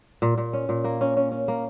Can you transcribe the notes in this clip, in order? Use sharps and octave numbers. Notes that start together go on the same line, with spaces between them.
A#2
A#2
C#4
A#2
A#3
C#4
C#4
C#4
A#3